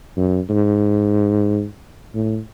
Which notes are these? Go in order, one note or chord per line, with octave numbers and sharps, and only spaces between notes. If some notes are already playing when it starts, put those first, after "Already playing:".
F#2
G#2
A2